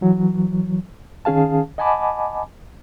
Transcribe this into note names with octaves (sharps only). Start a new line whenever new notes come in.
E3 F#3
D#3 C#4 G#4 F5 A5
D#5 F#5 G#5 A5 B5 D6